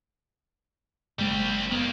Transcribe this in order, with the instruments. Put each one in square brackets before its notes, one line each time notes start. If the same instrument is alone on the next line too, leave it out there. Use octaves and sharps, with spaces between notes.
[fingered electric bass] F#1 G#3 A#3 [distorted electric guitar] G3 C4
[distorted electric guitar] D#3 A#3 [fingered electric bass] B3